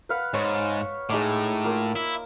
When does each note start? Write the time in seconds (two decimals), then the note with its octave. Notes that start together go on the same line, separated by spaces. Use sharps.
0.09 B4 F5 F#5
0.34 G#2 C#5
1.10 A2 G#3 D#4 D6
1.64 A#3 F4
1.96 E4